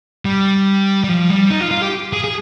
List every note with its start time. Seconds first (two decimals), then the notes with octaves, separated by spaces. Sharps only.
0.25 G3
1.04 G3
1.09 F3
1.30 G3
1.51 D#4
1.61 F4
1.71 F4
1.82 G4
2.13 G#4
2.24 G#4